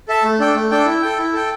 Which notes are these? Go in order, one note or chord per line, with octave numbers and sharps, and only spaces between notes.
A4 E5 A5
A3
D4 A4 G5
A3
D4 A4 G5
E4
A4 G5
E4
A4 G5